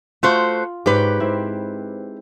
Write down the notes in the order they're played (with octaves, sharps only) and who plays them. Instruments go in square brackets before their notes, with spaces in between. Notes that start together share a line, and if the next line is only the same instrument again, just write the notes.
[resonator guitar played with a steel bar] A3 F#4 C5 [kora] F4
[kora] G#2 C#5 [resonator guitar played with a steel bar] G4 B4
[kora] C4 E4